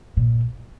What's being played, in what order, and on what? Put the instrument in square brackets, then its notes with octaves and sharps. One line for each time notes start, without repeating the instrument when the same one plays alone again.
[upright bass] A#2